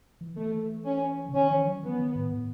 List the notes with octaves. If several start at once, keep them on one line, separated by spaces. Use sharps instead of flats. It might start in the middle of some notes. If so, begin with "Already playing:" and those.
E3
E3 A3
C#4
C#3
D#3 C#4
E3
F#3
E3 B3
D#3
A2
A2